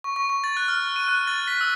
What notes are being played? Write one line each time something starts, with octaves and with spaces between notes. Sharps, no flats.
C#6
C#6
C#6
A6
F#6
F6
D#7
F#6
A6
B6
E6